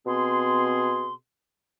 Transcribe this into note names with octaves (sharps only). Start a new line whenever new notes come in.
B2 C4 G#4 C6